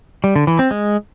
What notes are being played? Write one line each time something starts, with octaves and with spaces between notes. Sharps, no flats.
G3
D3
E3
C4
G#3